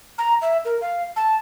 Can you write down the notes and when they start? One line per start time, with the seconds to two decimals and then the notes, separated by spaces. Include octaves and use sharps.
0.18 A#5
0.42 E5
0.65 A#4
0.81 F5
1.16 A5